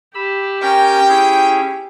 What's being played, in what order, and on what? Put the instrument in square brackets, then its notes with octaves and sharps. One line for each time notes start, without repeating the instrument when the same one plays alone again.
[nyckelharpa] G4 [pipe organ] B5 E6
[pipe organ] C#4 A#4 [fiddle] G5
[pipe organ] C#4 E4 G#4